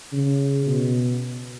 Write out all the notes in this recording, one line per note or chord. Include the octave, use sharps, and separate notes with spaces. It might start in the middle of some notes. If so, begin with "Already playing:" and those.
C#3
B2